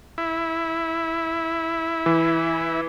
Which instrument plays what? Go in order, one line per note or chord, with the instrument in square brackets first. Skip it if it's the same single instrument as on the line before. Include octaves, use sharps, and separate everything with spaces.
[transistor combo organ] E4
[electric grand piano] E3